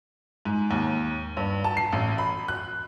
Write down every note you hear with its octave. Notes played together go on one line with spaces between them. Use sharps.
G#2
D#2
G2
A5
C7
A1
B5
F#6